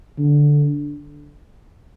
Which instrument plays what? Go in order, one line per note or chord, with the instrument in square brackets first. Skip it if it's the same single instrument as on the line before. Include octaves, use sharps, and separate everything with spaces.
[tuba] D3